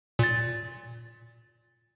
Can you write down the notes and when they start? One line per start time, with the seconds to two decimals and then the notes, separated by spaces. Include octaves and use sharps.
0.19 A#2 A6